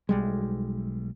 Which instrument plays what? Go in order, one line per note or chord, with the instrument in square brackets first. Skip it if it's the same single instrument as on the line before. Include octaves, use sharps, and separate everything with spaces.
[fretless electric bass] B1 G3 G#3